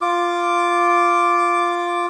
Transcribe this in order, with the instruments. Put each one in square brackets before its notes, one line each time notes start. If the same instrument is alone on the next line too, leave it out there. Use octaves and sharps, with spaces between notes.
[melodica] F4 D6